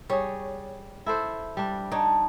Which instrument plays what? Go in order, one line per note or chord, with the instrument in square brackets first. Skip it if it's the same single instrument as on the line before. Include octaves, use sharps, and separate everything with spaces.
[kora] G3 G#4 [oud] C#5
[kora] E4 A4 C5
G3 D4
[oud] D4 [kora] D#4 C#5